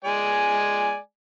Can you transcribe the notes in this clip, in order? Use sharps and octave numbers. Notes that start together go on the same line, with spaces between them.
G#3 D5 G#5